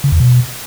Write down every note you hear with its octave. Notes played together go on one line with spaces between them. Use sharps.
C#3
E2
B2